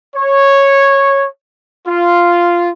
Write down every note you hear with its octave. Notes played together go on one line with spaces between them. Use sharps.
C#5
F4